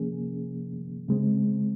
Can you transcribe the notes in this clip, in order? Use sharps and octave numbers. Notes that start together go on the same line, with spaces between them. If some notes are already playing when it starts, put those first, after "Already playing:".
Already playing: C3 F3 A#3 C#4 G#4
C#3 G#3 C4